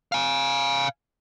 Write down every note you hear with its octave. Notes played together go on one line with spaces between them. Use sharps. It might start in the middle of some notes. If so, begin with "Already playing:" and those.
F5 G#5